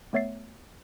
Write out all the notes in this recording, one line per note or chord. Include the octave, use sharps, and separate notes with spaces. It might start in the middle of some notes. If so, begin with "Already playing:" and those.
A3 B3 C#5 E5 A6 C7